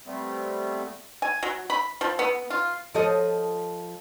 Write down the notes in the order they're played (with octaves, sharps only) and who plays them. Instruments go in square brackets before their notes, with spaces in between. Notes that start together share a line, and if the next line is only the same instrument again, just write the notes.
[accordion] G3 A3 B3 C4
[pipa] G#5
F#3
B5
F3
B3
F4
[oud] F3 A4 D#5